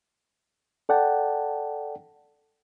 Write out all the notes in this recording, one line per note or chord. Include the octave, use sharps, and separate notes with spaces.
A4 D5 F#5 G5 A5